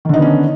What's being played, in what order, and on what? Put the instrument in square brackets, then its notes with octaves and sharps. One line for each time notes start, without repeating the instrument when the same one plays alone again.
[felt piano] D#3
D3
D#4
B3
C#4